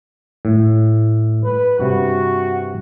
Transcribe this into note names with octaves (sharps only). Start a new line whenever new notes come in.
A2
B4
G2 C3 F#4